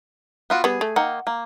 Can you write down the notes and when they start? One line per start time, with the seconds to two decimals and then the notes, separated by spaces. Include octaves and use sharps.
0.50 B3 F4 F#4
0.64 G3 B3 G#4
0.81 A3
0.96 D#3 A#3 F#5
1.27 A#3